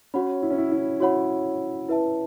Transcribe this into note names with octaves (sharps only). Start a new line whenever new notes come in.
C#4 F#4 C#5 F#5 B5
E4
C#4
E4
E4
E4 F#4 C#5 F#5 B5
E4 B4 E5 A5